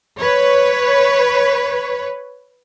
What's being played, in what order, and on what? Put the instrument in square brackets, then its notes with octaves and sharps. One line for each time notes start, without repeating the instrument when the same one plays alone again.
[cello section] B4 C#5